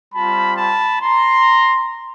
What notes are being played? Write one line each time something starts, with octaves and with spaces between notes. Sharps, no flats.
G3 C4 F4 A5 B5
A5 B5
A#5 C6